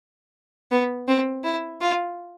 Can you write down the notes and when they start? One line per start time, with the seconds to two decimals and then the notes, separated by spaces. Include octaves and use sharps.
0.71 B3
1.08 C4
1.44 E4
1.81 F4